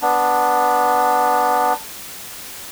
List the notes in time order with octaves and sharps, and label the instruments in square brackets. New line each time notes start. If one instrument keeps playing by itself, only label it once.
[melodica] B3 D4